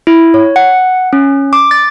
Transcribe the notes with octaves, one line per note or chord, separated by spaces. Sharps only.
E4
C#5
F#5
C#4
D6
A6